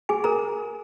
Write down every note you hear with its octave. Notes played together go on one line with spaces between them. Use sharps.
G#4 G#5
A#4 A#5